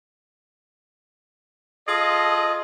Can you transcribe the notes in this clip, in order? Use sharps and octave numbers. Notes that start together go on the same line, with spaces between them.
F4 G#4 A4 D#5